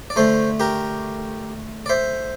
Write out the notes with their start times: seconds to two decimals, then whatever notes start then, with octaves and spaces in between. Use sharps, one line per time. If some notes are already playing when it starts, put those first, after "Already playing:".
0.10 D5
0.16 D3 A3 A4 C5
0.60 G4 A#4
1.86 D5
1.89 C5 E5